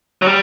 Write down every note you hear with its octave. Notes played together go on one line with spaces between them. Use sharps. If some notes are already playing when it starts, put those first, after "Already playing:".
F#3
G3